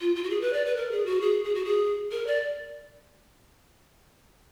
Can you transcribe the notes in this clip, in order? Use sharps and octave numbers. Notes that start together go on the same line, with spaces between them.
F4
F4
F#4
G#4
B4
D5
B4
A#4
G#4
F#4
G#4
G#4
F#4
G#4
A#4
D5